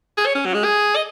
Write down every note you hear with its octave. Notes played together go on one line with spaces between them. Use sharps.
G#4
C#5
C#4
F#3
G#3
G#4
D#5